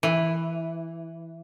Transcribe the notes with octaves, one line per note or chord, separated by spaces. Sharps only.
E3